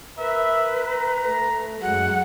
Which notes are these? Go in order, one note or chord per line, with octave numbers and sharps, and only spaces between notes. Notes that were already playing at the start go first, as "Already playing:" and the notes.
A#4 B4 E5
A#5
A3
F#2 F#3 G#3 F#5